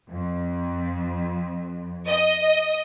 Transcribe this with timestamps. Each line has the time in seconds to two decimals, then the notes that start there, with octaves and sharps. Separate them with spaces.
0.11 F2
2.07 D#5